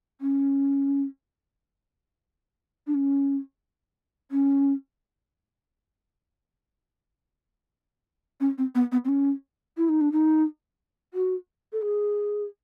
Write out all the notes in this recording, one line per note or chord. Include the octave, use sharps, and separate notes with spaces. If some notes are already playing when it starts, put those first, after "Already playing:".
C#4
D4
C#4
C#4
C#4
C4
B3
B3
C4
C#4
E4
D#4
D4
D#4
F#4
A4
G#4